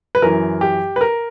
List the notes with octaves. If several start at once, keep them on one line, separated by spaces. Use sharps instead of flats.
B4
F#2 E3 A#4
G4
B4
A#4